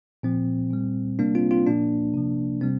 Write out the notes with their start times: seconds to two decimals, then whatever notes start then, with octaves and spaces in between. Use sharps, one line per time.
0.23 A#2 F3 C4
0.71 A#2 G3
1.19 C3 G3 A#3 D4
1.35 C4 F4
1.51 C4 F4
1.67 A#2 F3 A#3 D4
2.14 C3 F3
2.61 C3 G3 C4